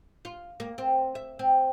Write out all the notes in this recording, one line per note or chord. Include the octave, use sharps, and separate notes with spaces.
F4
A#3
C4
E5
C4